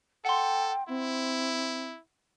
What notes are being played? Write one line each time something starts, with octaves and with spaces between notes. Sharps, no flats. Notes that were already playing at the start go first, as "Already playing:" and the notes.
A4 F#5 G5 C6
C4 E4